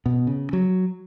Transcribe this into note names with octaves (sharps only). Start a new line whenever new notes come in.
B2
C#3
F#3